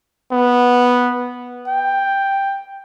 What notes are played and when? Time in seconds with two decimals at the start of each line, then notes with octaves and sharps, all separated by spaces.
0.32 B3
1.67 G5